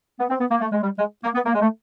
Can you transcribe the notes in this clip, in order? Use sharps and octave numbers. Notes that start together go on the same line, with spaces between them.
B3
C4
B3
A#3
A3
G#3
G3
G#3
A#3
B3
A#3
G#3
A3